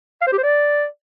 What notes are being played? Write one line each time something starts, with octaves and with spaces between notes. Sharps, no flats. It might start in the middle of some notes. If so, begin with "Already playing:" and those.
F5
C5
G4
C5
D5